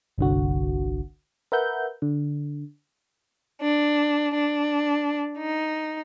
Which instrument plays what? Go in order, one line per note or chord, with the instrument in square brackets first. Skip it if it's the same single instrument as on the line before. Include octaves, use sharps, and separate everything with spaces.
[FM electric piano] G1 C2 D3 F#4
A#4 B4 E5 F#5 G6
D3
[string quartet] D4
D4
D#4